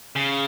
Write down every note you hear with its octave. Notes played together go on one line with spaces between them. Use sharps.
C#3